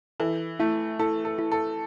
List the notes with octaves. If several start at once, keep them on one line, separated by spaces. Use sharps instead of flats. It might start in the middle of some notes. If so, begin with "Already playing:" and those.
E3 A4
A3 E4
E4 A4
A4
E4
A4